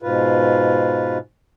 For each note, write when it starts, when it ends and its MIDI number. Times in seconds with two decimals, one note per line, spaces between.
0.03 1.18 44
0.03 1.18 47
0.03 1.18 65
0.03 1.18 71